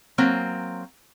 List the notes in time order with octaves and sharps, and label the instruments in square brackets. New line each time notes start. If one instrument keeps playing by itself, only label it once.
[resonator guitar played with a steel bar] F#3 A#3 C4